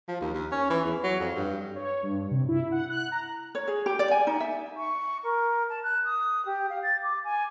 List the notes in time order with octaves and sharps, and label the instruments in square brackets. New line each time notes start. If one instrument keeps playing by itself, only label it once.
[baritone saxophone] F3
D#2
D#2
C#4
E3
E2
F#3
F2
G2
[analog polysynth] C#5
G2
C3
E4
F#5
F#6
A#5
[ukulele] C#5
G#4
G4
D5
G#5
D#4
E5
[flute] C#6
A#4
A5
F#6
D#6
G4
F5
A6
D6
G#5